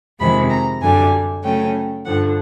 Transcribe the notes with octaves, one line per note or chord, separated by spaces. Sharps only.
F2 C3 D#3 G#3 C4 B5
A#5
F#2 D3 G3 G#5
C#3 F#3 A3 C#4 G5
G2 D3 F3 F#5